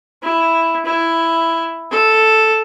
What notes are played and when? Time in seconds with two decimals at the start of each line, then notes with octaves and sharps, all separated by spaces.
0.22 E4
0.85 E4
1.91 A4